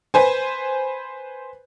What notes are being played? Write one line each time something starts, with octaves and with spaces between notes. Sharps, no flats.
B4 C5 G#5